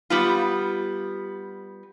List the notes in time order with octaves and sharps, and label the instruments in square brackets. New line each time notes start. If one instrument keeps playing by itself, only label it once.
[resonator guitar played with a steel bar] G3 B3 F4